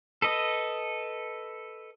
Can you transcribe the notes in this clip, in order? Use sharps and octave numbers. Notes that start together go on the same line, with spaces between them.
A4 B4 D#5